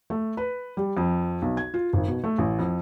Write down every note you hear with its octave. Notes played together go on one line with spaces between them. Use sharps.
A3
B4
G3
F2
B1
G#6
F4
G#1
B2
A3
A1
F2